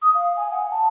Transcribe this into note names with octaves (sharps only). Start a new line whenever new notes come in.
D#6
F5
G#5
F#5
A5